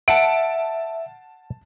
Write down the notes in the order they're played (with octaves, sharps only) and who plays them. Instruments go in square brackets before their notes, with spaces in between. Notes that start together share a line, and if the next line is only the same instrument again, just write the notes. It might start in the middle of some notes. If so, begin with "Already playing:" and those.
[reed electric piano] E5 [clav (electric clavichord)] F#5 [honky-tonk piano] A5 D7